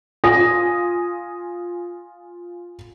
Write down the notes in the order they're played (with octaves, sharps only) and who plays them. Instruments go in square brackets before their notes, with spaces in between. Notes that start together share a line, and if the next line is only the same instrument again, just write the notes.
[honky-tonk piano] F4 G#5 D#6 A#6